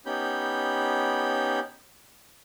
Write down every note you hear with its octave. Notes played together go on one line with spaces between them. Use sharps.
B3 C#4 D#4 G4 B5 G6